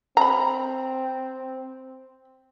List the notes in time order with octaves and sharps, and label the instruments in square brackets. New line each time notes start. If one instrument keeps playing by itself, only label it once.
[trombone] C4 [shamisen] A#5 B5